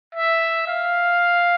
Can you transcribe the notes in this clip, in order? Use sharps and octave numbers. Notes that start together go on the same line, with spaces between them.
E5
F5